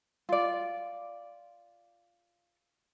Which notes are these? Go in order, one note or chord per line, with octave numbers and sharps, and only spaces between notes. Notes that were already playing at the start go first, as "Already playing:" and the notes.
F4 D5